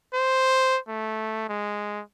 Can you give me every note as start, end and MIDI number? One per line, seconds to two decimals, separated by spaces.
0.14 0.78 72
0.89 1.47 57
1.49 2.01 56